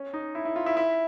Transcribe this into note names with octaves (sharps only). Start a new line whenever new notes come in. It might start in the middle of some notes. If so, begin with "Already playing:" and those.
Already playing: C#4
D#4
E4
E4
F4
E4
E4